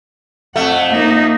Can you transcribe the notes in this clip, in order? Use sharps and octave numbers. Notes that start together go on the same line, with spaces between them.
F2 A3 F#5
A#3 D#4